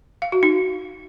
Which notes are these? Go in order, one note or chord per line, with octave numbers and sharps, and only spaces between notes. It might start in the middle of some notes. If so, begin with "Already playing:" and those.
F5
F#4
D#4